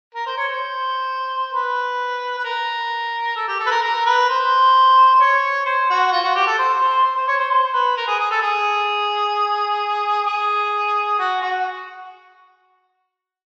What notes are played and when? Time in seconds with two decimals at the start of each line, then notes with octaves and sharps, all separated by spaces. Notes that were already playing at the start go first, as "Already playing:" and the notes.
0.15 A#4
0.26 C5
0.37 C#5
0.49 C5
1.52 B4
2.38 B4
2.45 A#4
3.36 A4
3.48 G4
3.60 A4
3.67 B4
3.71 A#4
3.83 A#4
4.06 B4
4.29 C5
5.20 C#5
5.66 C5
5.90 F#4
6.12 F4
6.24 F#4
6.35 G4
6.47 A4
6.58 C5
6.81 C5
7.05 C5
7.16 C5
7.27 C#5
7.39 C5
7.51 C5
7.74 B4
7.97 A#4
8.07 G#4
8.20 G#4
8.31 A4
8.42 G#4
10.26 G#4
11.19 F#4
11.41 F#4